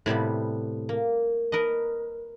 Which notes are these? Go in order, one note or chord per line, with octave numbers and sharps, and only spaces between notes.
A2 C3 G3 B3
A#3
A#4 B4 D#5